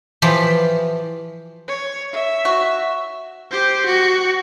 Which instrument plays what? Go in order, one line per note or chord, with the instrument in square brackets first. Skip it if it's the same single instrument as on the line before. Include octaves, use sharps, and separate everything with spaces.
[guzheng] E3 F3 G4 B5
[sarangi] C#5
E5
[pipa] F#4
[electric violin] G4 C5
F#4